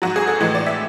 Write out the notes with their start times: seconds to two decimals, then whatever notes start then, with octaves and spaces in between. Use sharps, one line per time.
0.02 G#2 F#3 F#4
0.16 G#4
0.28 A4
0.40 A2 E3 G#3
0.55 D5
0.66 E5